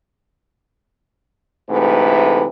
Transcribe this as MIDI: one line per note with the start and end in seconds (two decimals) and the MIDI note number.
1.70 2.46 38
1.70 2.46 44
1.70 2.46 48
1.70 2.46 52
1.70 2.46 57
1.70 2.46 71